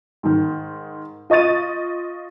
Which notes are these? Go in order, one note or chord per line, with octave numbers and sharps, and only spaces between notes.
G#2 D#3
F4 D#5 C#6 A6 D#7